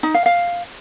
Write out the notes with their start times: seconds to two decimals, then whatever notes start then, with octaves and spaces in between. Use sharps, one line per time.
0.03 D#4
0.14 F5
0.26 F5